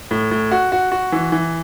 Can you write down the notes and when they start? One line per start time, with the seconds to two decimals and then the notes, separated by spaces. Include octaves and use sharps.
0.11 A2
0.31 A2
0.51 F#4
0.72 F#4
0.92 F#4
1.12 E3
1.32 E3